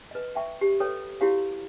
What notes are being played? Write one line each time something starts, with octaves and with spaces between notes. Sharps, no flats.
B4 D#5
E5 G5 C#6
G4
A4 B4 C#5 G5
E4 F#4 G4 C#5 F5